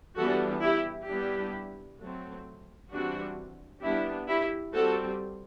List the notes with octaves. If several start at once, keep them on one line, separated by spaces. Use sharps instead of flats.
E3 G3 B3 D4 F#4 A4
E4 G4
G3 B3 D4 E4 G4
F#3 A3 C4
E3 G3 C4 D4 F#4
G3 B3 D4 E4 G4
E4 G4
G3 C4 F#4 A4